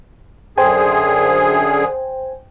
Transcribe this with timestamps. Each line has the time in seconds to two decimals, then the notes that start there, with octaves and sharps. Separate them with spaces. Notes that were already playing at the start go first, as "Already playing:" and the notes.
0.58 F#2 D3 G#4 C5 G5 G#5